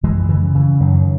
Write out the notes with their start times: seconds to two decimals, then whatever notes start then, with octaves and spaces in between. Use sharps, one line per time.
0.03 F#2 E3 G#3
0.29 C#3 E3
0.54 C#3 E3
0.80 F#2 D#3 F#3